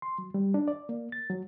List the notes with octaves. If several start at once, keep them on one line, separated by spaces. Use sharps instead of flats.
C6
F#3
G3
D4
D5
A#3
A6
F#3